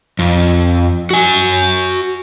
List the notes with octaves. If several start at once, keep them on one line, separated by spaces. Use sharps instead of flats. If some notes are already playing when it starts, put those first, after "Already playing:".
F2
F#4 G#5